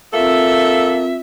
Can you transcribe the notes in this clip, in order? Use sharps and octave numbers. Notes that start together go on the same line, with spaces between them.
A#3 C4 F4 A4 E5